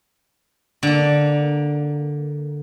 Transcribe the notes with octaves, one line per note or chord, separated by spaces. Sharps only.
D3 A#3